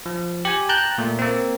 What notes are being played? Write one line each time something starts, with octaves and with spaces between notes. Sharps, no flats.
F3
G4 G#5
G5 A5 A#5 F#6 G6
A#2 A3
A#3 C4